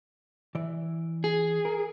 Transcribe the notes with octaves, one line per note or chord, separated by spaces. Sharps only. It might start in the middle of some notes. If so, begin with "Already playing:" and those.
E3 D5
G#4
A#4